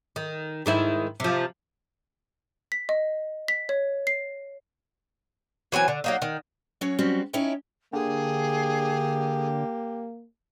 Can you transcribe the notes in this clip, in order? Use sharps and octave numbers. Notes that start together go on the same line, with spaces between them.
D#3
G#2 D#3 E4
C3 F3
B6
D#5
B6
C#5
C7
E3 F#3 C4 G#5
D3
F#3 A#3 D#4
D#3
F#3 C#4 F#4 C#5
F#3 G3 C4 C#4 F#4
C#4 D#4 E4 C#5 G5
D3 A#3 G4 G#4